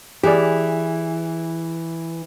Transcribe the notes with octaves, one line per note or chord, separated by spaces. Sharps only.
E3 G4 G#4 D5